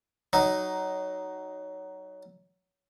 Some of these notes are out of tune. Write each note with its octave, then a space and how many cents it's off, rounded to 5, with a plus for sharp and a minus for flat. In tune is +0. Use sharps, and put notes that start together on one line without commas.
F#3 +20 D#4 +0